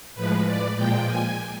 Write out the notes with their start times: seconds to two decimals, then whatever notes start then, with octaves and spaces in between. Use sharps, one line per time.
0.15 A2 F3 G#3 B4
0.46 D5
0.77 A#2 F3 G#3 G5
1.07 G#5